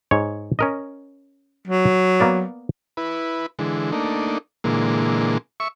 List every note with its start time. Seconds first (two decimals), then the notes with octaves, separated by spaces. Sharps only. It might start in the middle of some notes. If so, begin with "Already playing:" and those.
0.11 G#2 C#5
0.59 C#4 A#4 D#5
1.67 F#3
2.20 A#3 B3 D5
2.97 E4 B4
3.59 D3 E3 G#3
3.92 A3 A#3 D4 D#4
4.64 A#2 D3 E3 G#3 A#3
5.60 E5 C#6